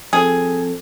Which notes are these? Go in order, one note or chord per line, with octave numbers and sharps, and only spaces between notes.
F3 C4 G#4 A4